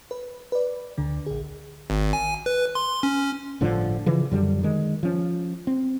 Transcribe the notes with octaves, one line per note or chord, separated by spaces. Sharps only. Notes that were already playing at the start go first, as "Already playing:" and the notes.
B4
B4 D5
D2 D3
A#1 G#4
G#1
G#5
B4
C6
C#4
G1 A2 D3 F3
C#3 E3 F3
F#2 D3 G3
D#3 G#3
F3 C#4
C4